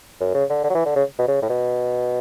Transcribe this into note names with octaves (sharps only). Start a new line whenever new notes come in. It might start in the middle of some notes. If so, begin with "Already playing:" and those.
F#2
C#3
D3
D3
F#3
E3
D3
C#3
B2
C#3
A2
B2